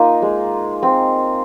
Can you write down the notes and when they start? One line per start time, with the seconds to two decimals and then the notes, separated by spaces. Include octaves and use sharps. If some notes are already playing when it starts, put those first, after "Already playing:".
Already playing: A#3 D#4 F4
0.22 G#3
0.83 C4